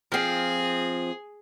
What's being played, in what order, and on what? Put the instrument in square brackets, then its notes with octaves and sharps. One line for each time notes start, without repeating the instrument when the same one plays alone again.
[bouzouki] F3 C4 [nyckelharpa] G#4